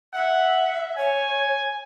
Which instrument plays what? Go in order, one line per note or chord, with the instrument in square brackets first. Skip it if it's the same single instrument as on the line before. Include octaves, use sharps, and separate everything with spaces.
[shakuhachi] E5 [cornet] F#5
[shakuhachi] C#5 [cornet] G#5